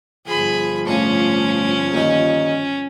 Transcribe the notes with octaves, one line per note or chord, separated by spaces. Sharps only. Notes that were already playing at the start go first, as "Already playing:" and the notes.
G1 F3 G#4 B5
A2 C#4 D4 F4
D#2 A#2 D#4